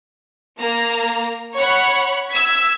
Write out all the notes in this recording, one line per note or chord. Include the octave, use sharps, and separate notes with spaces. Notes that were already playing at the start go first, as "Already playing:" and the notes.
A#3 A#5
C#5 F#5 B5
E6 G#6 B6